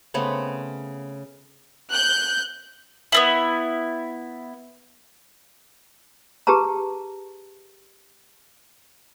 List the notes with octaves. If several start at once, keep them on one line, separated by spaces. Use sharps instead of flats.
C#3 A3 B3 C4
F#6 G6
B3 C4 E4
G4 G#4 B4 A5 A#5